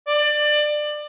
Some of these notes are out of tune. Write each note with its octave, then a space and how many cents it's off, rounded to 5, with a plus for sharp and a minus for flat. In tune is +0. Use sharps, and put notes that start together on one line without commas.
D5 +25